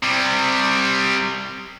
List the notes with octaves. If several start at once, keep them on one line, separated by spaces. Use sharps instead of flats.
C3 G3